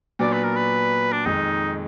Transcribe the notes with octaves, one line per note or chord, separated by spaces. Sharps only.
A#2 F#3 B3 D4 D5
B4
A#4
B4
D4
F2 D#3 G#3 D#4